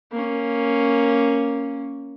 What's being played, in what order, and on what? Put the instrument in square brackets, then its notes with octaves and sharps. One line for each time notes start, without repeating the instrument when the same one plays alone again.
[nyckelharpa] A#3 C#4